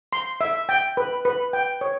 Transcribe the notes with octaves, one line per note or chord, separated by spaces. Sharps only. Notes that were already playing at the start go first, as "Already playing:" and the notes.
C6
E5
G5
B4
B4
G5
C#5